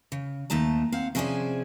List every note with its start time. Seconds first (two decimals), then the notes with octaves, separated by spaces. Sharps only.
0.12 C#3
0.50 D#2 A3 D#4 A5 A#5
0.92 C4 F5 F#5
1.15 C3 F3 C#4 G#4 C5 D5